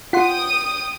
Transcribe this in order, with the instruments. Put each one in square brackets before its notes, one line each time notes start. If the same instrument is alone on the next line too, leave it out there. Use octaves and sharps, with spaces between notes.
[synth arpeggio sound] F4 F#5 C6 [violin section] G5 D#6